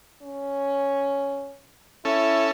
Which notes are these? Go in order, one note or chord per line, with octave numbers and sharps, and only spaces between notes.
C#4
C#4 E4 A4